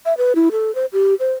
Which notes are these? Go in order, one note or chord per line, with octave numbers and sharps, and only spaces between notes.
E5
B4
E4
A4
C5
G4
C5